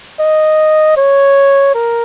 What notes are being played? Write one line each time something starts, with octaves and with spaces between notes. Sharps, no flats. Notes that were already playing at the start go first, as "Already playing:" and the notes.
D#5
C#5
A#4